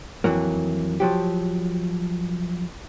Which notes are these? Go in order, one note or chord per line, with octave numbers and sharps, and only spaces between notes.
F2 A#2 E3 F#3 A#3
F3 F#3 G4